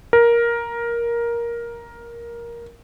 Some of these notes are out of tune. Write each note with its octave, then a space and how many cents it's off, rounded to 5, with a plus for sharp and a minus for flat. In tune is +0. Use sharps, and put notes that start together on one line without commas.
A#4 +10